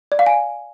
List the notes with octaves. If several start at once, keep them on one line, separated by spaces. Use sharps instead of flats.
D5
F5
G#5